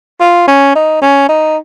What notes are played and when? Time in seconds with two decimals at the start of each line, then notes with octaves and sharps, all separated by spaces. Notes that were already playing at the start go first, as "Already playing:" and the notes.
0.20 F4
0.48 C#4
0.75 D#4
1.02 C#4
1.29 D#4